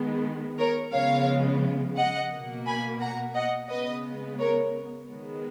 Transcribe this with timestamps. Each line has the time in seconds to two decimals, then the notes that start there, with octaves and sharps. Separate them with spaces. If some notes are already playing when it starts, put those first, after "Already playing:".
Already playing: D#3 G#3 B3
0.58 A#4 C#5
0.93 C#3 F3 G#3 B3 C#5 F5
1.97 D#5 F#5
2.31 B2 A#3
2.66 G#5 B5
3.00 F#5 A#5
3.35 D#5 F#5
3.69 C#3 G#3 B3 B4 D#5
4.39 A#4 C#5
5.08 D#3 G#3 B3